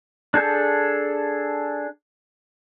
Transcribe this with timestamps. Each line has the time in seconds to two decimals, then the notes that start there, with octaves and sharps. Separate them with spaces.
0.34 D4 G#4 A4 G6